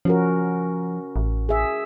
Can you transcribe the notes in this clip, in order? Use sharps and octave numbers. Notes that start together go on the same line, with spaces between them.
F3 C#4 F#4 A#4
A1
G#4 E5